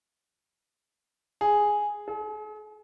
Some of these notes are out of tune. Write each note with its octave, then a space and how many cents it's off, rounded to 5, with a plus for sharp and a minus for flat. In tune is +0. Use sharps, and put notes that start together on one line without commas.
G#4 +0
G#4 +45